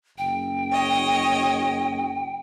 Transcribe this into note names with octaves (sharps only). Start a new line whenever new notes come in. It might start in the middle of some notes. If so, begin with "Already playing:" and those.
F#1 G5
C#5 D#5